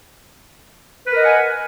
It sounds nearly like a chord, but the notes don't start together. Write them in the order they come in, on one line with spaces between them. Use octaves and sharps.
B4 A#4 D#5 F#5 G#5